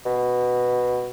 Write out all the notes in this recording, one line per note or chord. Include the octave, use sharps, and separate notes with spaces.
B2